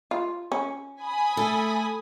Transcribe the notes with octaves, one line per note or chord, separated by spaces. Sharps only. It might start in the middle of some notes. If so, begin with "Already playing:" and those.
F4
C#4
G#5 B5 D#6
A3 A4